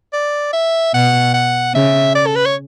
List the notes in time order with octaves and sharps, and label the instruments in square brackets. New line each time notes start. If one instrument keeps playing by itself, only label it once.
[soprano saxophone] D5
E5
[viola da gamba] B2 [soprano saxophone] F#5
[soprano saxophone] F#5
[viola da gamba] C#3 [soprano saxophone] E5
[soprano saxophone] D5
A4
B4
C#5